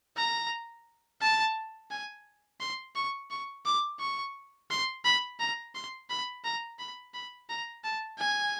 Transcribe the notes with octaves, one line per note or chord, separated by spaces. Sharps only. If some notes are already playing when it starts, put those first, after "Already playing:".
A#5
A5
G#5
C6
C#6
C#6
D6
C#6
C6
B5
A#5
C6
B5
A#5
B5
B5
A#5
A5
G#5